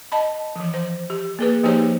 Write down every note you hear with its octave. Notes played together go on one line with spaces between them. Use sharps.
D#5 A5 B5
E3 F3
C5
G4
A#3 G#4 B4
F3 A#3 D#4 G4 C5 C#5